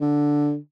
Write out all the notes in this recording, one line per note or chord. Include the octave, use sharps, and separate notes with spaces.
D3